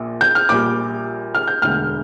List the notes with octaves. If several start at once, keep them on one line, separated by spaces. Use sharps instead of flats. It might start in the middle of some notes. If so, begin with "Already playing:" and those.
Already playing: A#1 A#2
G6
F6
A#1 A#2 G3 D6
F6
G6
E1 D2 D3 F6